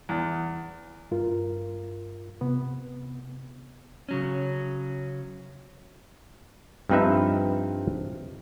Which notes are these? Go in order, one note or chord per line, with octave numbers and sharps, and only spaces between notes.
E2
G2 F4 A#4
C3 B3
C#3 F#3 C#4
G2 F3 C4 D#4 B4 E5